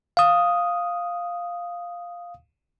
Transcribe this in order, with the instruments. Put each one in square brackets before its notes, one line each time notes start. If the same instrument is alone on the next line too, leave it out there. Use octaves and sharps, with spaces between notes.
[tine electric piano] F5 D#6